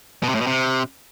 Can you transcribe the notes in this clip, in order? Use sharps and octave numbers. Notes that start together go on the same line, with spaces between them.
B2
C3
A2
B2
C3